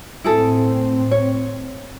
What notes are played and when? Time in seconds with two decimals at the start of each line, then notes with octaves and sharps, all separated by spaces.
0.24 A2 C4 E4 G#4 A4
1.11 C#5